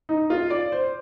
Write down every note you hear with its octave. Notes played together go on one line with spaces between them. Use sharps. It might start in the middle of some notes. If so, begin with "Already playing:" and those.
D#4
F4
D5
C5